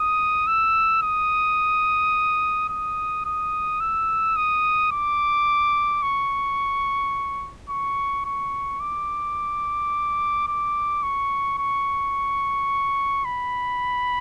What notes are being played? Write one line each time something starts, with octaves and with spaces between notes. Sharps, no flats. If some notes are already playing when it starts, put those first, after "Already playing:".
Already playing: D#6
E6
D#6
D#6
D#6
E6
D#6
D6
C#6
C#6
C#6
D6
D6
C#6
C#6
B5